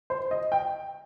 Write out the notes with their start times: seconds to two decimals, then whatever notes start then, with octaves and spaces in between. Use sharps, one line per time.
0.10 C5
0.31 D#5
0.52 G5